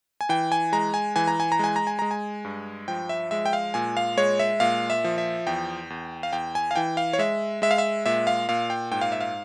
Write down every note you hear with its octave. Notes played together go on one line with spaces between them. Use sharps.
G#5
E3 G5
G#5
G#3 A#5
G#5
E3 G#5
A#5
G#5
A#5
G#3 G#5
A#5
G#5
G#3 A#5
G#5
G2
F3 G5
E5
G#3 E5
G5
F5
A#2 G#5
F5
G#3 C#5
E5
A#2 F5
E5
F3
E5
E2 G5
E2
F5
E2 G5
G#5
F5
E3 G5
F5
C#5
G#3 E5
G#3 E5
F5
E5
A#2 E5
F5
A#2 F5
G5
G#2 G5
F5
E5
F5